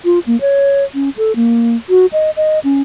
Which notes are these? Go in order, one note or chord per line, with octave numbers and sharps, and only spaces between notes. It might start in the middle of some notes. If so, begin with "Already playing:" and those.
F4
A#3
C#5
C#4
A4
A#3
F#4
D#5
D#5
C#4